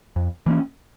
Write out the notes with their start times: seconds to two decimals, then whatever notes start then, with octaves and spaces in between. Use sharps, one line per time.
0.16 F2
0.46 E3 A#3 C#4